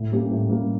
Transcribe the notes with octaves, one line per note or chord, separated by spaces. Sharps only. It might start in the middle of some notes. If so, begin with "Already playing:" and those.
Already playing: A2
G3 A#3 C#4 G4
A2
G3 A#3 C#4 G4